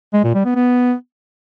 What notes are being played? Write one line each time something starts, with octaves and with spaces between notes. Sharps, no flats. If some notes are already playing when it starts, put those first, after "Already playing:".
G#3
A#2
G3
B3
B3